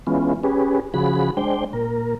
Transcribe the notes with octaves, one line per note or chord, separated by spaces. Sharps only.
E3 G#3 B3 C#4 F4
C#4 G4 G#4 B4
C#3 F3 F#4 G#4 B5
G#3 D4 C5 G5
A#2 A#4